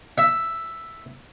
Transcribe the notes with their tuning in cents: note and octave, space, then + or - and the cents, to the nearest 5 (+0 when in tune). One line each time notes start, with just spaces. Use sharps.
E5 +0